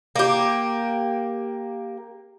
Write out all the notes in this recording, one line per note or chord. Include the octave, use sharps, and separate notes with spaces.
A#3 G4